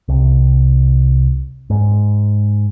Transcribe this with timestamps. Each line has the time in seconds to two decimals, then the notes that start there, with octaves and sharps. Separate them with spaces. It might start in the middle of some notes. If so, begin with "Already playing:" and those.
0.08 C2
1.70 G#2